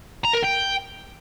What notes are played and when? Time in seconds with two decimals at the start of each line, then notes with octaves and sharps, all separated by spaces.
0.25 A#5
0.35 A#4
0.44 G5